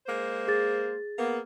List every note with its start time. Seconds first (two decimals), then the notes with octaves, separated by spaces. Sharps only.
0.07 G#3 A#3 C5
0.48 G#4 A6
1.18 A#3 B3